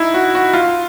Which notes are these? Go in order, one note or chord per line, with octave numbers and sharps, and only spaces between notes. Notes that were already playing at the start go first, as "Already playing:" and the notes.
Already playing: D#4 E4
F#4
F#4
F4